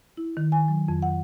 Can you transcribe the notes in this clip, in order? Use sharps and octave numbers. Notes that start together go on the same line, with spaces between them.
E4
D#3
G#5
F#3
F2
F#5